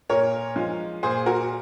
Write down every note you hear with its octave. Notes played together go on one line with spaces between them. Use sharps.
A#2 A#4 C#5
F3 G#3
A#2 G#4 C5
F#4 A#4